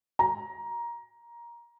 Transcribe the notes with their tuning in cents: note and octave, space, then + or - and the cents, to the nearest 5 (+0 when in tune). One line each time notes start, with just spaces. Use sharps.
A#5 +15